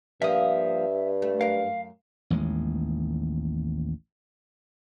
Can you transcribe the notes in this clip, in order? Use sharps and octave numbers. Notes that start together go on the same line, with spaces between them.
G2 F3 A#3 E5 D#6
A3
F#2 A#4 F5
A1 D#2 G#3